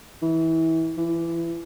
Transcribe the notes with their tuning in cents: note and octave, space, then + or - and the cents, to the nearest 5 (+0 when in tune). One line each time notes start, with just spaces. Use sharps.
E3 -25
E3 +25